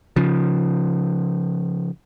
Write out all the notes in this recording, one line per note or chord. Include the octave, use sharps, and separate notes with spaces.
C#3 F3